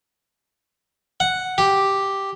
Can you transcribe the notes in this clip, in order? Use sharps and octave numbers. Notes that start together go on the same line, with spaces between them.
F#5
G4